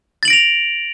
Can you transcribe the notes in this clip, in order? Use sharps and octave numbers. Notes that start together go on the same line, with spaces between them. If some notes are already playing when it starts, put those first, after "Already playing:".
A6 A#6 D7 F7 F#7